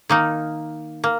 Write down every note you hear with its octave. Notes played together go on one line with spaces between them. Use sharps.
D#3 A#3 D#4
A#3